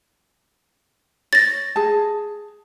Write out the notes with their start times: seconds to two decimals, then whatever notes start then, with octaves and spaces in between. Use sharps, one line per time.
1.33 C#5 A6 A#6
1.76 G#4 A5